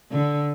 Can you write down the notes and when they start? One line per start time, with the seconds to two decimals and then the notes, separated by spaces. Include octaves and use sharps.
0.11 D3